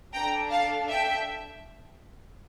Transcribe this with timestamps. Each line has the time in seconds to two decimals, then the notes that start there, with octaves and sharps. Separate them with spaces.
0.13 D4 A4 G5 A#5
0.51 F5 A5
0.89 E5 G5